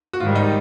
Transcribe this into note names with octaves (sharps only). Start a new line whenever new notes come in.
F#4
G#2 D#3 G3 F4
D#4